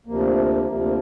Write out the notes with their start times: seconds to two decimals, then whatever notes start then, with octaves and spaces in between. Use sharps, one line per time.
0.06 D2 C3 F3 A#3
0.65 D2 C3 F3 A#3
0.80 A#3